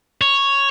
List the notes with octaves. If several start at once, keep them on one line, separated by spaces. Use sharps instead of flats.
C#5